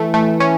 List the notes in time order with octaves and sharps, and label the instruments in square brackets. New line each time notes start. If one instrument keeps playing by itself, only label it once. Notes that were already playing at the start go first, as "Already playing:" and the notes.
Already playing: [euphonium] E3 [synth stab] A3
[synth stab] A3
C#4